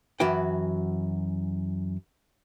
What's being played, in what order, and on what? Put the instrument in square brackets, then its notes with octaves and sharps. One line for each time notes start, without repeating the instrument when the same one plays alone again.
[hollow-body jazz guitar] F#2 E3 F#4 B4 G5